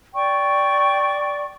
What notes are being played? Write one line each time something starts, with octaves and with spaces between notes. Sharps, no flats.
D5 G5 C#6